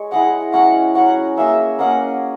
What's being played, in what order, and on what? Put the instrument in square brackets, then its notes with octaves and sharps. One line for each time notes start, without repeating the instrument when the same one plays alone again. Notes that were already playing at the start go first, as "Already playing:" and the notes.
Already playing: [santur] G#3 C#5
[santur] E4 G#4 D#5 [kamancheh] F#5
[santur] F#3 C#4 F#4 C#5 [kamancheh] F#5
[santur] F#3 C#4 F#4 C#5 [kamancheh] F#5
[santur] A#3 C#4 G#4 D#5 [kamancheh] E5
[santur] A#3 C#4 G#4 D#5 [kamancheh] F#5